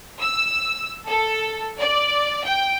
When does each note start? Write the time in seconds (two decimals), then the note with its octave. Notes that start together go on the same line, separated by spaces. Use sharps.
0.21 E6
1.07 A4
1.80 D5
2.44 G5